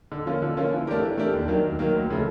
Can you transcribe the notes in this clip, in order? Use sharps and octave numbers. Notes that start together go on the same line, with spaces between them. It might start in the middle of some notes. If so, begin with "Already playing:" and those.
D3
F3 A#3 C#4 F4
D3
F3 A#3 C#4 F4
E3
A3 D4 G4 A#4
E3
A3 D4 G4 A#4
D#2
D#3 F#3 A#3
D#2
D#3 F#3 A#3
D2
C#3 F3 A3